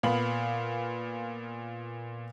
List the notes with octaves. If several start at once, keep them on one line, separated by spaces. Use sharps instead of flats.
A#2 B3 F5 B5 F#7